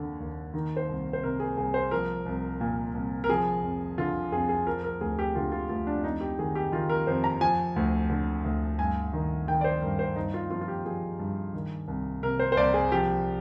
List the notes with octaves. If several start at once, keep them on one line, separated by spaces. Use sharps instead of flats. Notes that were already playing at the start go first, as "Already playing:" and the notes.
Already playing: D#2 D3
D#2
D#3 D#4
C5
C2
C5
C3 A#4
G#4
C2 G#4
C5
F3 A#4
C2
A#2
C2
A#4
F3 G#4
F2
D3 F4
F2 G#4
G#4
F3 A#4
A#4
D2 G#4
G4
D3 F4
F4
D2 F4
D4
F2 D#4
G4
D#3 G#4
G4
D#3 F4
A#4
F2 C5
A#5
F3 G#5
D2
D3
D2
G2 G#5
D#3
D#3 G5
D5
C5
G2 A#4
C5
G2 D#4
F4
F3 F4
F4
G4
F3 G#4
G2
D#3
C2
C3 A#4
C5
C5
C2 D5
G#4
F3 G4